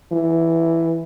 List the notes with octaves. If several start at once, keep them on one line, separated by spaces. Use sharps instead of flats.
E3